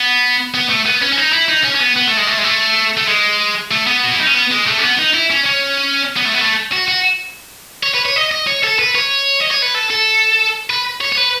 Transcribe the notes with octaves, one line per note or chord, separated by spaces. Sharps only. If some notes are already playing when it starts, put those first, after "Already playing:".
Already playing: B3
B3
A3
B3
C#4
C#4
D#4
E4
D#4
C#4
C#4
B3
B3
A3
G#3
A3
G#3
A3
A3
G#3
A3
B3
F#4
E4
D#4
C#4
B3
G#3
A3
C#4
B3
D#4
E4
C#4
C#4
B3
A3
B3
A3
F#4
F#4
C#5
B4
C#5
D#5
D#5
C#5
A4
B4
C#5
D#5
C#5
B4
A4
A4
B4
C#5
C#5
B4